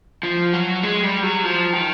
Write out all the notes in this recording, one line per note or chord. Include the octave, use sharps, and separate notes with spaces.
F3
F#3
G#3
G3
F#3
F3
D#3